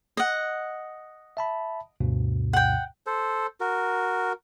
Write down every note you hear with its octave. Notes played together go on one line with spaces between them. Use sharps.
D#5 F#5
E5 A5 B5
D2 G2 B2
F#5 G5
A4 C5
F#4 A#4